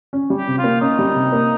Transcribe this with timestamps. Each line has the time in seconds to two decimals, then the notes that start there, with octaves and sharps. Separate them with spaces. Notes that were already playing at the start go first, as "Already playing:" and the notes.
0.13 C#4
0.30 G3
0.36 G4
0.47 C3
0.58 F4
0.64 A#3
0.81 C#4 D#4
0.99 G3
1.15 C3
1.32 A#3